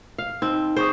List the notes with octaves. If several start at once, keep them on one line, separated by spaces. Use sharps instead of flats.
F5
C4 D#4
G#4 C5 C#6 D#6